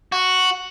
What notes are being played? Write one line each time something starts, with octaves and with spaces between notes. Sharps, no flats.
F#4